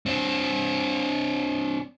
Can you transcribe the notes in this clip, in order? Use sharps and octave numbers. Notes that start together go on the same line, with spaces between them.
C4 D4